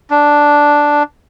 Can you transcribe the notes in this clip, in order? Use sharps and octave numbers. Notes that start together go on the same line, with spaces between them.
D4